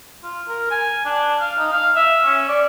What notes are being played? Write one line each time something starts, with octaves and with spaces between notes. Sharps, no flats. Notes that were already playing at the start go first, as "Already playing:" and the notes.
F4
A#4
G#5
D4
F5
D#4
F5
E5
C#4
D5